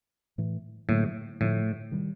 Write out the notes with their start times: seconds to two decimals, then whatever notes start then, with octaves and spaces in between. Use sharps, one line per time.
0.38 A2 E3 A3
0.89 A2 D3 F#3 A#3
1.40 A2 D3 F3 A3
1.91 C3 D#3 G3